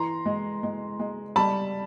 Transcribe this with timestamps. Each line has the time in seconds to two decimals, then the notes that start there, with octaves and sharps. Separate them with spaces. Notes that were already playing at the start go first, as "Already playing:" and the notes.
Already playing: E3 A#5 C6
0.26 G#3
0.63 G#3
1.00 G#3
1.36 G3 A5 B5